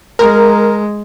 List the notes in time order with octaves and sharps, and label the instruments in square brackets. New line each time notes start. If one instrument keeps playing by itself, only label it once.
[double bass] G#3 [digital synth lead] A#4